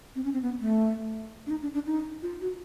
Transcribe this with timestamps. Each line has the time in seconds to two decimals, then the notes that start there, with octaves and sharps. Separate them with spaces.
0.15 C4
0.24 C#4
0.33 C4
0.42 B3
0.60 A3
1.47 D4
1.50 D#4
1.63 D4
1.74 D4
1.86 D#4
2.22 F4
2.41 F#4